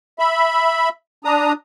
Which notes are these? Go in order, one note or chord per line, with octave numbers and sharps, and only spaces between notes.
E5 B5
D4 A#5 D#6